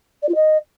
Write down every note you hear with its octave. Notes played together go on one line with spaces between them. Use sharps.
D5
F4
D#5